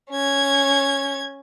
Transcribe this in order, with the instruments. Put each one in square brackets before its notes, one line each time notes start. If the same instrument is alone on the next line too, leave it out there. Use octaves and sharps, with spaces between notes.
[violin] C#4 G#6